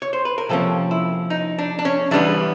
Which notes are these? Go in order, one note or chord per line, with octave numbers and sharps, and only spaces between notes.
C#5
C5
B4
A#4
C3 F3 A#3 C#4 A4
E4
D#4
D4
D4
C#4
E3 G3 B3 D4